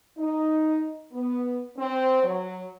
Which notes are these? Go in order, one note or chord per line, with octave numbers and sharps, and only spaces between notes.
D#4
B3
C4
F#3